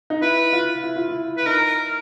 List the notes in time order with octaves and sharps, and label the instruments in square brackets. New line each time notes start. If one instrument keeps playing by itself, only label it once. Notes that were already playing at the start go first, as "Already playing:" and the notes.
[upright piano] D#4
[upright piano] E4 [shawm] B4
[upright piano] F4
E4
F4
E4
[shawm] B4
[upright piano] D#4 [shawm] A#4